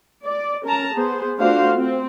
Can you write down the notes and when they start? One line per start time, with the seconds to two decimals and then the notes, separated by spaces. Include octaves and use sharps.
0.24 D5
0.64 C#4 A#4 A5 A#5
0.93 B3 G#4 C5
1.37 A3 D4 F4 F#4 C5 F5
1.75 C4